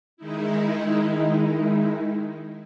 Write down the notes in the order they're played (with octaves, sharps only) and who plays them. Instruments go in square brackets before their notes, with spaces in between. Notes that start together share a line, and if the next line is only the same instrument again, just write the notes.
[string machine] D#3 G#3 D#4 E4